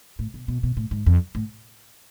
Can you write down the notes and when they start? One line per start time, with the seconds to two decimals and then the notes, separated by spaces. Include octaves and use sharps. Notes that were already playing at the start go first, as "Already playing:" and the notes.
0.19 A2
0.34 B2
0.48 B2
0.63 B2
0.77 A2
0.91 G#2
1.06 F2
1.35 A2